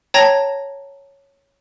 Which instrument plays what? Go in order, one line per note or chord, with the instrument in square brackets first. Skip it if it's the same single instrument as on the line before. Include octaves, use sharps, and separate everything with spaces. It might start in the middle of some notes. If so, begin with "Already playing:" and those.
[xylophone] C#5 G5 A5 A#5 G#6 A#6